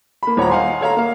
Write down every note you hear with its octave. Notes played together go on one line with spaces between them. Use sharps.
A#3 B5
D#1 C#5 F#5 A#5
D#5 F5 F#5 G#5 C6
A4 C#5 F5 A#5
A#3 F5